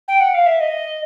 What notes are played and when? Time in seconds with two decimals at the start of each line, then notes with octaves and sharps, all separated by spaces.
0.08 G5
0.20 F#5
0.34 F5
0.46 E5
0.60 D#5